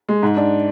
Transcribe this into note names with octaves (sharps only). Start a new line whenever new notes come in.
G#3
G#2
D4